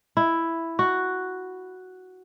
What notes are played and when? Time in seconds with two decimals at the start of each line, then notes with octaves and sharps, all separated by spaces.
0.17 E4
0.79 F#4